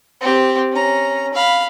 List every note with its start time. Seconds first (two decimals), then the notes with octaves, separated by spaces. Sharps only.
0.21 C4 G4
0.72 C#4 A#5
1.34 F5 B5